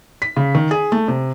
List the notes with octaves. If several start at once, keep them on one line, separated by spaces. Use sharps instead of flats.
B6
C#3
D#3
G#4
A3
C3